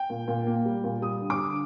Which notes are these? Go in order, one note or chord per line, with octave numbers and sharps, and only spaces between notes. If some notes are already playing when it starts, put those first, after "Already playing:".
Already playing: G5
A#2
A#2
A#3
G3
A#2
G3 D#6
D3
D6
D3